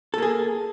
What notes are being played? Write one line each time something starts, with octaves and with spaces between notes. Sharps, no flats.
A#3 G#4 A4